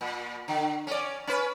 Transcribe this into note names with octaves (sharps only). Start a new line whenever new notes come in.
A#2
D3
C#4 D5
C#4 B4